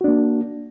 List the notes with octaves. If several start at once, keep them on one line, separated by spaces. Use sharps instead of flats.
A#3 D4 F#4